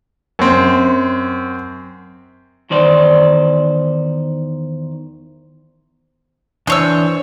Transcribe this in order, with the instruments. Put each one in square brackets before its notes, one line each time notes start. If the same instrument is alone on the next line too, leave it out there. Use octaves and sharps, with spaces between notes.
[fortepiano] F#2 C4
[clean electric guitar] E2 D#3 C5 D5
[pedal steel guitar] E3 D4 [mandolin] C5 C#5 E6